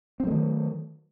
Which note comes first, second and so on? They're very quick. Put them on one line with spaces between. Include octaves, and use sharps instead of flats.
C4 F#3 A3 D#3